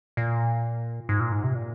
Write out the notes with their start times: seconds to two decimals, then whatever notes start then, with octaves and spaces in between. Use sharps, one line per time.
0.17 A#2
1.09 G#2
1.20 A#2
1.32 G#2
1.44 C3
1.55 A#2